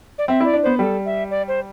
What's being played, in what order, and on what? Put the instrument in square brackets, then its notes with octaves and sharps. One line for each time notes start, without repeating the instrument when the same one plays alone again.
[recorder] D5
[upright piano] C4 [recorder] E5
[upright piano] E4 [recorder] D5
[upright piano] D4
[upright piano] B3 [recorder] C5
[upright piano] G3 [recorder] A4
[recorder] E5
D5
C5